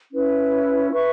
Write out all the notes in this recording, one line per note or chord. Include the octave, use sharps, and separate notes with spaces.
C#4 E4 B4
B4 E5 C#6